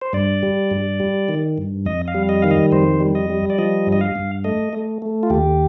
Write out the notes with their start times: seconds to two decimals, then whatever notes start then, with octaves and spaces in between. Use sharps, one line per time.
0.02 C5
0.13 G2 D5
0.43 G3
0.71 G2
1.00 G3
1.29 D#3
1.58 G2
1.86 F2 D#5
2.08 F5
2.14 G3
2.29 D#5
2.42 D#3 F5
2.51 D#5
2.72 F2 C5
3.00 G3
3.15 D#5
3.30 G3
3.50 D5
3.58 F3 D#5
3.87 G2
3.92 D#5
4.01 F5
4.15 G2
4.44 A3 D#5
4.73 A3
5.02 A3
5.23 F4
5.30 D#2 G4